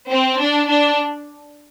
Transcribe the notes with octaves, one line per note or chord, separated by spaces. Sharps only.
C4
D4
D4